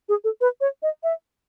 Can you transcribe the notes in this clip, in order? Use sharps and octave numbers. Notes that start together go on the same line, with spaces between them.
G#4
A4
B4
C#5
D#5
E5